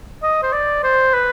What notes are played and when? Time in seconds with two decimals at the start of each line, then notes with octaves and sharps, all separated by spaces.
0.23 D#5
0.43 C5
0.53 D5
0.84 C5
1.14 B4